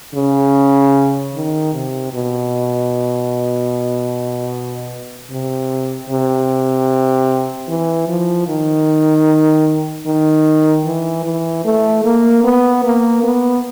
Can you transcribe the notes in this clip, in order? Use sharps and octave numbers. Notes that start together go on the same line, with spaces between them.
C#3
D#3
C3
B2
C3
C3
E3
F3
D#3
D#3
E3
E3
A3
A#3
B3
A#3
B3